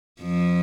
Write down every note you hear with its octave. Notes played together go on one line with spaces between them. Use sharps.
F2 F3